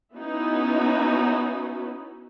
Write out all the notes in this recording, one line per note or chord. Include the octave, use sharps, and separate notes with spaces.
B3 C#4 D#4 E4 F#4 B4